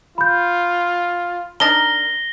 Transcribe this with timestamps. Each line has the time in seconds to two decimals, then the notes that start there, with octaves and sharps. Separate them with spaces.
0.18 F4 B5 G6
1.60 D4 D#4 A#4 A#6 G7